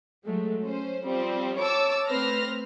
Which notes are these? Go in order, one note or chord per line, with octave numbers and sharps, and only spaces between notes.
F#3 G#3 A3
C#4 C5
F3 G3 C4
C#5 A5 D6 E6
A3 C4 B4 C5 F6 A#6